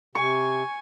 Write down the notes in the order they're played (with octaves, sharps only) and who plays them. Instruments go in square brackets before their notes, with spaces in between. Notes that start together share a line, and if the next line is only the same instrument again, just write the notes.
[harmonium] C3 [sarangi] G#5 [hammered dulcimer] C#6